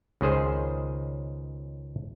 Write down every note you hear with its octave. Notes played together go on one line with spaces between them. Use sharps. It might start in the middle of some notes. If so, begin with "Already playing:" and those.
C#2 D#3 C#4 G#4 C5